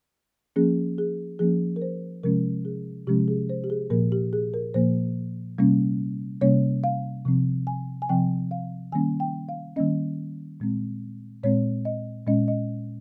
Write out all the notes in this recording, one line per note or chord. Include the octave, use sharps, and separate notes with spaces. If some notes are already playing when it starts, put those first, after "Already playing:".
F3 A#3 C#4 G#4
G#4
F3 A#3 C#4 G#4
A#4
C5
C3 F3 G#3 C#4 A#4
G#4
C3 F3 G#3 C#4 G4
G#4
C5
G4
G#4
A#2 F3 A#3 A#4
G4
G#4
A#4
A#2 F3 A#3 C5
C3 G3 A#3 C#4
C3 G3 A#3 C#4 C#5
F5
C3 F3 C4
G#5
G#5
C3 F3 C4 G5
F5
D#3 G3 A#3 C#4 G#5
G5
F5
D#3 G3 A#3 C#4 D#5
A#2 G#3 C4
A#2 G#3 C4 C#5
D#5
A#2 G#3 C#4 D#5
D#5